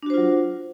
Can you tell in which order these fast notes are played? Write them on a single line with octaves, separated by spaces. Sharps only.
D4 F#4 C5 F4 F#3